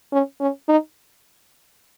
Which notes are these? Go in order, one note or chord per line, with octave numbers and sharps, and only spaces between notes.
C#4
C#4
D#4